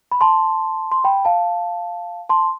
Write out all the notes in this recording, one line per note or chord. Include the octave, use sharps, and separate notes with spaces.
B5
A5 C6
C6
G5 B5
F5 A5
A5 C6